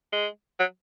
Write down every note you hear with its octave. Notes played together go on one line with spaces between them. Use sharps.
G#3
F#3